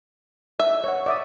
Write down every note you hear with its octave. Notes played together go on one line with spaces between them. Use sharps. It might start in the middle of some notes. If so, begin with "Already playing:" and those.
E5
C#5 F#5
D5 E5 D#6